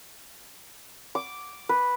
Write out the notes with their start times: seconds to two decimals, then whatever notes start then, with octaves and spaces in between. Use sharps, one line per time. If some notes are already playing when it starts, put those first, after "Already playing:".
1.15 D6
1.69 B4